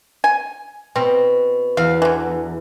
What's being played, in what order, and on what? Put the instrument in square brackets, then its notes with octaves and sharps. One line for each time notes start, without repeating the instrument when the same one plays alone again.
[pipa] G#5
[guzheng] B2 [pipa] C4
[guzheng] E2 [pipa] F5
[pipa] D3 E3